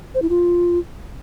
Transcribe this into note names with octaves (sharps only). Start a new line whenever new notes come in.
C5
E4
F4